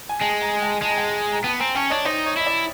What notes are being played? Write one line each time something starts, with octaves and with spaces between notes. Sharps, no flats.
G#5
G#3 G5 A5
G#5 A#5
G5 A5
G#3 A5
A#5
G5 A5
A#5
B3 G5 A5
C4 G#5 A#5
C#4 G5 A5
D4 C#5 D#5
D#4 C5 D5
C#5 D#5
E4 D#5
D5 E5